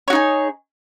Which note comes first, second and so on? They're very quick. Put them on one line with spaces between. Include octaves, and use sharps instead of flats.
C#5 F#4 D#4 G#4